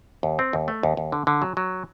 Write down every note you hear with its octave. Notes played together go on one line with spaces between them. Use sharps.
D#2
C4
D#2
A3
D#2
D#2
D3
D3
F#3
F#3